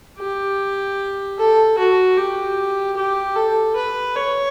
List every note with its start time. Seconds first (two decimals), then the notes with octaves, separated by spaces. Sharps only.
0.19 G4
1.38 A4
1.78 F#4
2.17 G4
2.96 G4
3.36 A4
3.76 B4
4.15 C#5